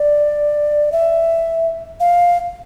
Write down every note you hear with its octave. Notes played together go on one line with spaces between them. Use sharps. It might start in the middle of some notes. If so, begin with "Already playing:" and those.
Already playing: D5
E5
F5